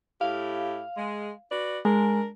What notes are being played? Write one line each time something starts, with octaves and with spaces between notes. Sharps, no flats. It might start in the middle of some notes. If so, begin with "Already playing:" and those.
A2 E4 G4 F5
G#3
F#4 B4 D5
G#3 D4 A#4